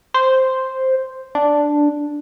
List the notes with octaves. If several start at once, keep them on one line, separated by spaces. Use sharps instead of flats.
C5
D4